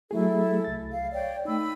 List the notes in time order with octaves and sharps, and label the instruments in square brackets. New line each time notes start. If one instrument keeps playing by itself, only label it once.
[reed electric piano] F#3 A3 G#4 [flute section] E4 A4
[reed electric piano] C2 A6
[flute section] F5
C#5 D5 G5
[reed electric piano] A3 D#4 [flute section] B5 E6